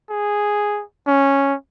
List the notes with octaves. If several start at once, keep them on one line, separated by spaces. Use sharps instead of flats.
G#4
C#4